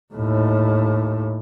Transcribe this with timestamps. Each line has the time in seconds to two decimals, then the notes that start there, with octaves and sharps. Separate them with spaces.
0.14 D#2 A2